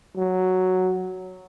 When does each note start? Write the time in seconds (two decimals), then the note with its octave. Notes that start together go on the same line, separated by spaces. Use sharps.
0.16 F#3